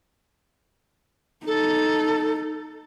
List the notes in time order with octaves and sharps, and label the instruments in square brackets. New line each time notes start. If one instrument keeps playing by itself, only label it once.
[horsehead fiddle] D#4 [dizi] A4